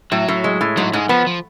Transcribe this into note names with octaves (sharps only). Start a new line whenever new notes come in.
A2 F#3
A2
G#3
A2
G#2 F#3
G#2 G#3
F3 B3
F3